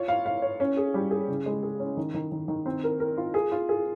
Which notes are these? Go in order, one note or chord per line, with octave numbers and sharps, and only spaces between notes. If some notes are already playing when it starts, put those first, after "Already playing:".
Already playing: F4 C#5
F5
F5
C#5
C#4
G#4
G3
G#4
C#3
G#3
G#4
C#4
D#3
D#3
D#3
D#3
C4
A#4
A#4
F4
G#4
F4
G#4